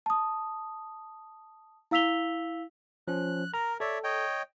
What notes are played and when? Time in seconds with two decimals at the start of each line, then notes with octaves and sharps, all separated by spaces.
0.06 A5 D#6
1.91 E4 F5 E6 B6 F7 G7
3.08 F3 C#4 F#6
3.54 A#4 A#5
3.80 A4 C#5 D5 E5
4.04 C#5 D#5 G5